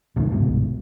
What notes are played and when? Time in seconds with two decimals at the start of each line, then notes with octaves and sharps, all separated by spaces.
0.16 D#1 C2 A2 D#3
0.32 G1 C2 G#2 B2